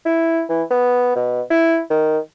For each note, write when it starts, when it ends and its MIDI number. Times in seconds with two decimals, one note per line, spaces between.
0.06 0.43 64
0.50 0.63 52
0.71 1.15 59
1.16 1.42 47
1.50 1.81 64
1.90 2.19 51